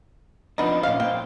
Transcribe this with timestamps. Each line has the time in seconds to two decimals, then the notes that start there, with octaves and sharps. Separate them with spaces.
0.58 F3 B3 C4 D4 D#4
0.83 A#2 C#4 F5
1.00 A#3 C5 G5